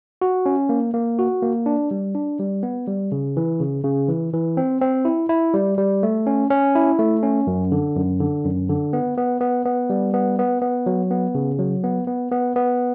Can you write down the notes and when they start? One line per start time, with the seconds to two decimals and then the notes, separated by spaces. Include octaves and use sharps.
0.22 F#4
0.46 C#4
0.69 A#3
0.94 A#3
1.19 F#4
1.42 A#3
1.66 D4
1.91 G3
2.15 D4
2.39 G3
2.63 B3
2.87 G3
3.12 C#3
3.37 E3
3.60 C#3
3.84 C#3
4.08 E3
4.33 E3
4.57 C4
4.81 C4
5.05 E4
5.29 E4
5.54 G3
5.78 G3
6.03 A3
6.27 C#4
6.50 C#4
6.75 E4
6.99 A3
7.23 C#4
7.47 F#2
7.72 D3
7.96 F#2
8.20 D3
8.45 F#2
8.69 D3
8.93 B3
9.18 B3
9.41 B3
9.65 B3
9.90 G3
10.14 B3
10.39 B3
10.62 B3
10.86 F#3
11.11 B3
11.35 C#3
11.59 F#3
11.84 B3
12.07 B3
12.32 B3
12.56 B3